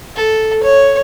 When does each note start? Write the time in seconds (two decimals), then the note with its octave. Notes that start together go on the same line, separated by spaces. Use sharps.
0.16 A4
0.63 C#5